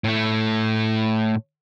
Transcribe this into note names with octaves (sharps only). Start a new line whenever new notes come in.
A2 A3